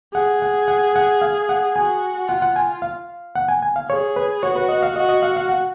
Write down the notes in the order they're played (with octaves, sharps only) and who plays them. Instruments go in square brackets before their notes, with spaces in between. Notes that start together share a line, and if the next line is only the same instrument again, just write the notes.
[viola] G#4 [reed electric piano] F#5
[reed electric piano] F#5
F#5
F#5
F5
F#5
[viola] F#4 [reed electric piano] G#5
[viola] F4 [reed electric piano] F#5
[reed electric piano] F#5
G#5
F5
F#5
G#5
G#5
F5
[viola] G#4 [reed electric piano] C#5
[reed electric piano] B4
[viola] F#4 [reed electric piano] C#5
[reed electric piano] B4
D#5
F5
[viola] F#4 [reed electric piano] D#5
[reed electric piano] D#5
F5
F5
F#5